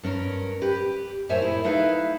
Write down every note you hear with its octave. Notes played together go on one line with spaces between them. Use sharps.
G2 C#4 A#4
G4 B4
F#2 A2 C5 C#5 E5 G#5
E4 G#4
A3 D#4 E4 B4 E5 F5